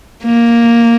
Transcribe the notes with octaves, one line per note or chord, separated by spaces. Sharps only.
A#3